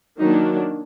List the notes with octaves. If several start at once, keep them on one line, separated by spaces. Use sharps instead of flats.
D#3 F#3 A#3 D4 D#4